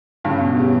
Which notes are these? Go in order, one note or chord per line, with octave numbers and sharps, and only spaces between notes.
G2 C#3 F#3 C#4 F#4
B2
C#3 E3 G3 C#4 G4